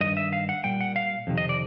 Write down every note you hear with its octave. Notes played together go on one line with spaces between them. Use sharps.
G2 D#3 D#5
E5
F5
F#5
A#2 G3 G5
F#5
F5
F2 C3 D#3
D#5
D5